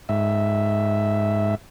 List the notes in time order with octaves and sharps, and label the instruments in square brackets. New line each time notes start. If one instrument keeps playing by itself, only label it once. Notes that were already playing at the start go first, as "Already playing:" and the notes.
[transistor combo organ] G#2 E5